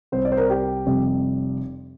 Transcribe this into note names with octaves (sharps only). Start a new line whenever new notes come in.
C2 C3 G3 C5
D5
C5
A#4
G4
F1 F2 C3 G3